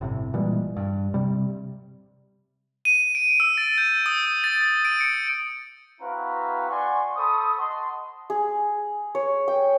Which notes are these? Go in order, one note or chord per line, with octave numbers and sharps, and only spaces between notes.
G1 A2 C3
A#2 E3 G3 G#3
G2
C3 G3
D#7
D7
E6
A6
G6
D#6
A6
A6
D7
C#7
C4 E4 F#4 B4 F5 A#5
D5 F#5 G#5 C6 C#6
A4 C5 B5 C#6 D#6
D#5 F#5 A5 C6
G#4
C#5
G5